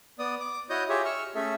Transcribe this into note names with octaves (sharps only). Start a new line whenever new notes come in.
B3 D5 D#6
D6
E4 F#4 C#5 D#5 D#6 G6
F4 G4 G#4 C#5 E5
C#6 E6 F6
A3 C#4 G#4 A4 E5